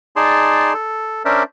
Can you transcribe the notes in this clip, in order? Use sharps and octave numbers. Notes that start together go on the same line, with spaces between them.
D#4 G#4 D5 A5 C6
A4
C#4 D4 A#4 C5 D5 E5